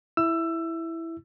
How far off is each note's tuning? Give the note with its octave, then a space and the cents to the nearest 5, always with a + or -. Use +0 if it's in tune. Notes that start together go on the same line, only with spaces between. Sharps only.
E4 +0 E6 +20